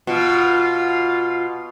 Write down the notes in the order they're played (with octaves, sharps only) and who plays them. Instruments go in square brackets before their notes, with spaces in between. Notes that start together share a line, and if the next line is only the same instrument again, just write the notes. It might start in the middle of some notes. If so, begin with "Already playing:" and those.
[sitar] B2 [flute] F4